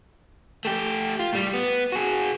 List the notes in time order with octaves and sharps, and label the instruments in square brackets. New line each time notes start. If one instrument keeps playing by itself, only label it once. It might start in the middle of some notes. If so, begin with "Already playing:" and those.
[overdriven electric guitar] A3 G4
F4
A2 G3
B3
F#4 G#4